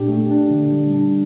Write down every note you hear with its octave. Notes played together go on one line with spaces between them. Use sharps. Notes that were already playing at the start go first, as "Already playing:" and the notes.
Already playing: A#2 D4 G4
A3
D4
D3
G3
D4